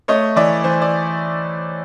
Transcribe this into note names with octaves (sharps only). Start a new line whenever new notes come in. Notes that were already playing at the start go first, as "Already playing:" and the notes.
A3 C#5 D#5
E3 D5 E5
E3 C5
D5